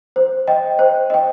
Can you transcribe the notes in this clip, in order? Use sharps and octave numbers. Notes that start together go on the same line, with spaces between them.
C5
D#5 G5
C5
D#5 G5